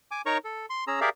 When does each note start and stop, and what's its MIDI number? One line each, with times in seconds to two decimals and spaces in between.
0.11 0.22 80
0.11 0.22 86
0.26 0.38 63
0.26 0.38 70
0.26 0.38 73
0.26 0.38 82
0.26 0.38 85
0.44 0.66 69
0.70 0.84 84
0.87 1.00 61
0.87 1.00 68
0.87 1.00 82
0.87 1.00 88
1.01 1.09 67
1.01 1.09 68
1.01 1.09 70
1.01 1.09 74
1.01 1.09 76
1.01 1.09 77